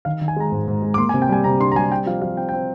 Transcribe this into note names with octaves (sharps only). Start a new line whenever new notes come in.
D#3 F5
D#3
G#5
G#3 A#5
G#2
G#2
G#3
D6
A#3 C6
G#5
C3
G5
G3 G#5
C3 A#5
D4 C6
A#5
G3 G#5
C4 G5
F3 F5
F3 F5
C4 G5
G5
C4